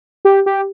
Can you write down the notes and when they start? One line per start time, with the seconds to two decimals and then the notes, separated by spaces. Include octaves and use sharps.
0.25 G4
0.46 G4